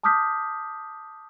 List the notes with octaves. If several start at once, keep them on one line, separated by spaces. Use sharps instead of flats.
A5 D6 D#6 F6 G6 B6